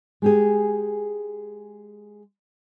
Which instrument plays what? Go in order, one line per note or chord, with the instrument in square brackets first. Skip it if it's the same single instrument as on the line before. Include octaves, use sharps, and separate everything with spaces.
[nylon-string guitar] G#3 G4 G#4